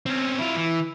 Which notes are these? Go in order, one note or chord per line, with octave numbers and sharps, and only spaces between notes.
C4 C#4
E4 F4
E3